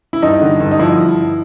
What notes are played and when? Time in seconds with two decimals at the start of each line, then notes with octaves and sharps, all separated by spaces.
0.13 E4
0.22 G2 D#4
0.41 D3
0.60 G2
0.71 D#4
0.79 F3 E4